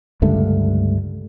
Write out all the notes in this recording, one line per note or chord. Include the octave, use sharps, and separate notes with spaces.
C#2 G2 D3 A3